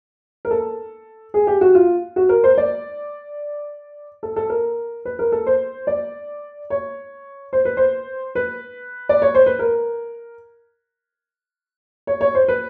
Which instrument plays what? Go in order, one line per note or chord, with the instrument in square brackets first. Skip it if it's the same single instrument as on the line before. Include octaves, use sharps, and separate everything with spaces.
[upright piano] A#4
A4
G#4
G4
F#4
F4
F#4
A#4
C5
D5
A4
A4
A#4
B4
A#4
A4
C5
D5
C#5
C5
B4
C5
B4
D5
C#5
C5
B4
A#4
C#5
C#5
C5
B4